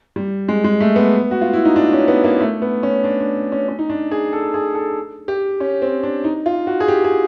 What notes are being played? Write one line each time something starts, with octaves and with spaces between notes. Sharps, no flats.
G3
G#3
G#3
A3
B3
F#4
F4
E4
D#4
D4
C#4
B3
A#3
A3
B3
C#4
D4
D4
C#4
C#4
D#4
D4
G#4
A4
G#4
A4
G4
C#4
C4
D4
D#4
F4
F#4
G#4
G4
G#4